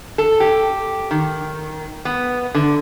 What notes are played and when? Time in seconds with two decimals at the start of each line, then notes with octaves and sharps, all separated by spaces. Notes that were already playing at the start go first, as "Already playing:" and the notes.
0.18 A4
0.40 G4
1.11 D#3
2.05 B3
2.55 D3